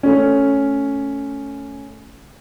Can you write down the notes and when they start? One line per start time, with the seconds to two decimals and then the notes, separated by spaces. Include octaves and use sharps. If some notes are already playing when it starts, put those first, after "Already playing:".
0.03 A3 C#4